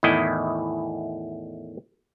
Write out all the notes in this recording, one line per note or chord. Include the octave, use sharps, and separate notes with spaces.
E2 A2 D#3 E4 D#5